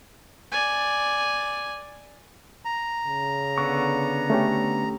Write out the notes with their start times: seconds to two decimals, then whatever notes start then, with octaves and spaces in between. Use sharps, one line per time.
0.52 D5 G#5
2.65 A#5
3.07 C#3
3.58 D3 B3 C#6
4.30 A3 C#4 G4